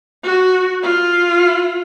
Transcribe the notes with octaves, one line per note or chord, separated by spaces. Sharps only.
F#4
F4